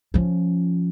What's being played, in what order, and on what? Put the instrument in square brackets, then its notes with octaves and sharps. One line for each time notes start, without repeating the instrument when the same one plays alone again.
[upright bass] F3 C#4